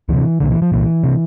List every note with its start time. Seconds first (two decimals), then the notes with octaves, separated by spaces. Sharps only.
0.09 D2 C3 E3
0.40 C2 A#2 D3
0.51 E3
0.62 F3
0.72 C2 A#2 E3
1.04 C3